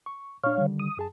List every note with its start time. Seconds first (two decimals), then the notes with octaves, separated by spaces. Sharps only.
0.06 C#6
0.44 A#2 D4 C#5 F5
0.58 D3 D#3 G3
0.80 D#6
0.97 F#2 G#4 A5